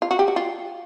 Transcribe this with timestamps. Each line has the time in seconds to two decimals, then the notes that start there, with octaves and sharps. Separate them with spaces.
0.02 F4
0.11 F#4
0.19 G4
0.28 F#4
0.36 F4